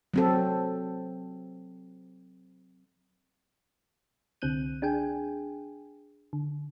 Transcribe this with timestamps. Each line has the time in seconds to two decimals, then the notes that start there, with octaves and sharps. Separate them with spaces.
0.14 F#3 C4 A4
4.42 C2 D3 C4 F#6 G6 D#7
4.82 D4 G#4 G5 G#5
6.33 D3